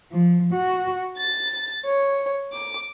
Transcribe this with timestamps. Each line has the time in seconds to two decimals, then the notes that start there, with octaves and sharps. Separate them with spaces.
0.11 F3
0.52 F#4
1.18 A6
1.86 C#5
2.53 D6